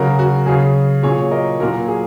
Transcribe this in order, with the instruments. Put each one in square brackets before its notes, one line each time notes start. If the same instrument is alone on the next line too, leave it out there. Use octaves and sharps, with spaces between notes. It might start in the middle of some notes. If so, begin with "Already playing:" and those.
Already playing: [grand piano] C#3 F#3 F#4 A#4
F#4
C#3 F#3 G#4
A#2 F#3 G#4 C#5
A#4 D#5
A#2 F#3 F#4 A#4
G#4